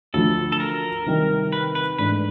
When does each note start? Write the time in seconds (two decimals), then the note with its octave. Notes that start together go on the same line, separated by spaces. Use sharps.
0.14 D2 D3 F3 A4
0.52 A4
0.60 A#4
1.06 C3 D#3 G3
1.52 B4
1.75 B4
1.99 G#2 E3 A3 D4 B4